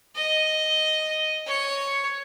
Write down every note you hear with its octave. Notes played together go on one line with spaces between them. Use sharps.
D#5
C#5